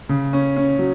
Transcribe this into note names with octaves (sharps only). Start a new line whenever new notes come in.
C#3
C#4
C#4
F#3